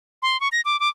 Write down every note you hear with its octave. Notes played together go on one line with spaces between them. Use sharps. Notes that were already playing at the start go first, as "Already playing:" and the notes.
C6
C#6
A#6
D6
D6